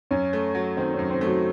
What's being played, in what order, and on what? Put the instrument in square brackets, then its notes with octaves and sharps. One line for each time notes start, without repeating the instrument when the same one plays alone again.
[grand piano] F#2 [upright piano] C#4
[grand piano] A3
F#3
[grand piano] D#3 [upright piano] C4
[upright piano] C#4
[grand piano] F#2
[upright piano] C4
[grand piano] A3
[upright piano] F#3